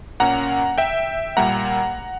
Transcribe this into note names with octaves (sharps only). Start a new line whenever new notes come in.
A#2 A#3 C#4 F#5 A#5
E5 G5
A#2 G3 A#3 F#5 A#5